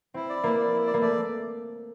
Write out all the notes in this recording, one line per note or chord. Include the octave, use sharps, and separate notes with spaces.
C4 E4
D5
A#3 E4
D5
E4
D5
A#3
A3 D5